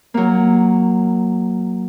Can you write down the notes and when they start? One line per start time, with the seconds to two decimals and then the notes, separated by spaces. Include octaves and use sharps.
0.14 F#3 A#3